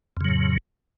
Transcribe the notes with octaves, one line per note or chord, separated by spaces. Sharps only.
F2 A2 C#3 F#3